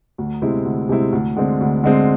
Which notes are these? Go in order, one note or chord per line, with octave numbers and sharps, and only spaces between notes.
D2
C3 G#3 C4 E4
D2
C3 G#3 C4 E4
D2
D3 G#3 C4
D2
D3 G#3 C4